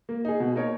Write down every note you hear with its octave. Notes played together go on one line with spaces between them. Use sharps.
A#3
D#4 G#4
B2
A#3 D#4 A#4 C#5